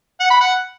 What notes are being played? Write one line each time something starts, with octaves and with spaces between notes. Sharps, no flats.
F#5
B5
F#5